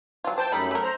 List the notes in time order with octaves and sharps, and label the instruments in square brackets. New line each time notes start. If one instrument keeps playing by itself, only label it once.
[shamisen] F#3 F4
[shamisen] C5 [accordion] G5 A5
[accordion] F#2 B5 [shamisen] G3 A3 D#4
[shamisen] A3 A#4
[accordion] C5 A#5